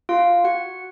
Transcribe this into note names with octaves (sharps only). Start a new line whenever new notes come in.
F4 F5
F#4 F#5